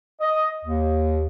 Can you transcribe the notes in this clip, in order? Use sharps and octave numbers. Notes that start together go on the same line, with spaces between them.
D#5
D#2